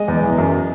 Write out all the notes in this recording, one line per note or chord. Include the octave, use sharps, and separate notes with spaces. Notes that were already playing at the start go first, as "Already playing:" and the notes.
Already playing: G#3 D#5
E2
E3
F#2